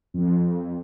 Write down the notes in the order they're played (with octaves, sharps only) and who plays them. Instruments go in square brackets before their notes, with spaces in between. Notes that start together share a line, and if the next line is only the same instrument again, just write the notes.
[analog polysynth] F2